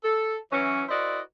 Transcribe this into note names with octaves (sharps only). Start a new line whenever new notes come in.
A4
E3 F#3 C#4
E4 F#4 A#4 C5 D5 D#5